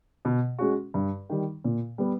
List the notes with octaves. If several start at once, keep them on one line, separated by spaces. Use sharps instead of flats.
B2
G#3 C#4 F#4
G2
D#3 G3
A#2
G3 B3